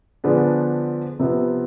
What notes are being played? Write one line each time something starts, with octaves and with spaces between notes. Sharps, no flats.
D3 F3 B3 D4 G#4
C3 F3 B3